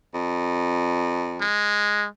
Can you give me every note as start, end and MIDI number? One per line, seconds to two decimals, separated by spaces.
0.14 1.44 41
1.41 2.07 56